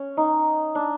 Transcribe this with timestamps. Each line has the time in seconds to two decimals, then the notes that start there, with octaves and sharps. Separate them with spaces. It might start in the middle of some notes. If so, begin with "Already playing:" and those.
Already playing: C#4
0.17 D#4
0.75 D4